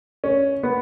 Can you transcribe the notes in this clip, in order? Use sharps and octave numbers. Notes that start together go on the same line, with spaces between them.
C#4
B3